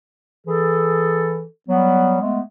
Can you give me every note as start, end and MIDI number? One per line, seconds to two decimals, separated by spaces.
0.47 1.44 52
0.47 1.44 68
0.47 1.44 69
1.69 2.17 54
1.69 2.17 55
1.69 2.17 59
2.22 2.41 56
2.22 2.41 57
2.22 2.41 59